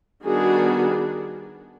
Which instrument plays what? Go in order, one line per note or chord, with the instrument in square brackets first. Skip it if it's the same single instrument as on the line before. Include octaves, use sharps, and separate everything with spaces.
[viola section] D#3 G3 B3 D4 F#4 G#4